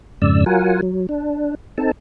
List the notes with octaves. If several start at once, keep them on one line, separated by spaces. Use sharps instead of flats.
F2 G#2 C#3 D5 E6
F#3 F4 A#4 F#5 G#5
F#3
D4
C4 D#4 A4 A5